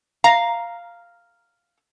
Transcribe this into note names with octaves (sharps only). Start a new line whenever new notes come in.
F5 A#5